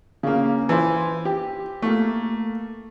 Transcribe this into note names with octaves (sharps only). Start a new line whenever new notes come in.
C#3 A#3
E3 C5
G4
A3 A#3